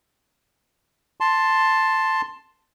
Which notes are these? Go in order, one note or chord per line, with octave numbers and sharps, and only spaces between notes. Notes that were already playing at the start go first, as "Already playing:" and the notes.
A5 C6